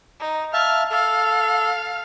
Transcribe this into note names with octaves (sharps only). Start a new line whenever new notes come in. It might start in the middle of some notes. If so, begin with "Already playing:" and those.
D#4
E5 F5 A5 F6
A4 F5